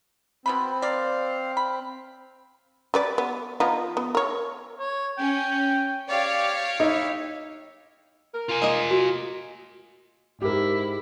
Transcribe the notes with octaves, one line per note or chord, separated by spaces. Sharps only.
B2 B3 C4 B5
A#3 D5 F5
B5
G3 B4 D5
B3
F3 B3 D#4
B3
A#4 C#5
C#5
C#4 G5
G4 C#5 D5 F5
D#4 E4
A#4
F4 G#5
G#3 A#3 D#5
F#4
G#2 E4 G4 A#4